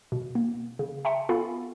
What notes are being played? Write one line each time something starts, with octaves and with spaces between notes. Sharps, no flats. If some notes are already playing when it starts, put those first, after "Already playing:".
B2
A#3
C#3
E5 G5 A5 A#5 C6 C#7
B3 F4 A4 F5 G#5 B5